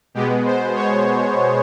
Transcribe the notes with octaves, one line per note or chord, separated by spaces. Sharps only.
B2 G#3 B3 G4
C5
C#5